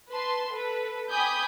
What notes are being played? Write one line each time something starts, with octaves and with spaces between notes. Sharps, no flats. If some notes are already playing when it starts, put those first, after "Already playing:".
B4 A5 C6
A4 B4
G5 G#5 B5 D6 D#6 G6